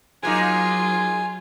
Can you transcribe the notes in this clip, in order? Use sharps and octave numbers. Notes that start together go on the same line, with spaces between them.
F#3 G#3 A#3 D#4 F4 G#5